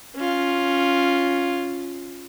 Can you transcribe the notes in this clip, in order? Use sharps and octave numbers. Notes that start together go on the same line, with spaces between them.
C#4 F4